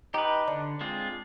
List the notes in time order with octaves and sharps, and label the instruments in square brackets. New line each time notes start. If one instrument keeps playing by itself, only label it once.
[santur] D#4 [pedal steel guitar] G4 B4
[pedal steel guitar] D3 [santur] D4
[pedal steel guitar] G#3 C4 F4